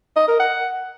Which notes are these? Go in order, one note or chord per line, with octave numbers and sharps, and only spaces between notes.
D#5
A#4
F#5